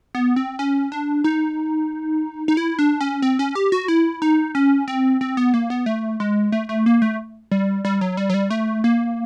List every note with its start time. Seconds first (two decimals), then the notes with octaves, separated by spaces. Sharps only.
0.15 B3
0.36 C4
0.59 C#4
0.92 D4
1.24 D#4
2.48 D#4
2.57 E4
2.79 D4
3.01 C#4
3.22 C4
3.39 C#4
3.55 G4
3.72 F#4
3.88 E4
4.22 D#4
4.55 C#4
4.88 C4
5.21 C4
5.37 B3
5.54 A#3
5.70 B3
5.86 A3
6.20 G#3
6.52 A3
6.69 A3
6.86 A#3
7.02 A3
7.52 G3
7.85 G3
8.01 F#3
8.17 G3
8.30 F#3
8.34 G3
8.51 A3
8.84 A#3